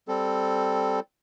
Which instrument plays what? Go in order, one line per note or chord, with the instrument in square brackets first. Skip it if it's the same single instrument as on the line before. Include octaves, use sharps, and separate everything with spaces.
[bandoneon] G3 C4 A4